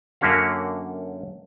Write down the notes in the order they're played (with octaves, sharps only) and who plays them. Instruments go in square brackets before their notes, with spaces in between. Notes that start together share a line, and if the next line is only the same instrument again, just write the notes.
[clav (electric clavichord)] F#2 D3 A#3 C#4 F#4 F5